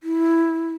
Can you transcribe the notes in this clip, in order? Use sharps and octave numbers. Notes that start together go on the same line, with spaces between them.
E4